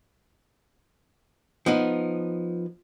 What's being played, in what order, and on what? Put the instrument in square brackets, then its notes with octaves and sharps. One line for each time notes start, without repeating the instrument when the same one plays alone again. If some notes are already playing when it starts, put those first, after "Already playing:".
[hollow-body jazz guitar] F3 B3 D#4